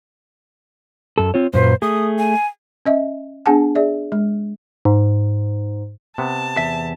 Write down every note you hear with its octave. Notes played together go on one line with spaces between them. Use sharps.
F#2 A4
C4 F4 C#5
F#2 A#2 B4 C5
A3 G#4 D#6
G#5
C#4 D#5 E5
B3 D4 G#4 F#5 G#5 A5
G#4 D5 E5
G#3
G#2
C3 B3 A5
E2 E5